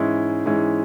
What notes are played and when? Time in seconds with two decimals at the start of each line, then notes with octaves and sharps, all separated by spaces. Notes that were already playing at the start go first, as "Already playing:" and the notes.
Already playing: G#2 E3 G#3 C#4 E4
0.46 G#2 E3 G#3 C#4 E4